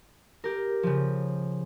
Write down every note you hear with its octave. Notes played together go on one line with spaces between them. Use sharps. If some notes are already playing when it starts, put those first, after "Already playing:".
G4 A#4
C#3 F3